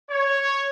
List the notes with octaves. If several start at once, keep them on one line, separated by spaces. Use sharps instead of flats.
C#5